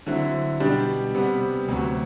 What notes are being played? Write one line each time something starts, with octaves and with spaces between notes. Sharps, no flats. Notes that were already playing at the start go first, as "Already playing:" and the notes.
D3 F#3 C4 E4
B2 G3 D4 G4
C3 G3 B3
D2 C3 F#3